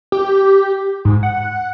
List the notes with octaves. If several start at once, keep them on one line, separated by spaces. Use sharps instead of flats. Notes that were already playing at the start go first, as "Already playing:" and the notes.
G4
G#2
F#5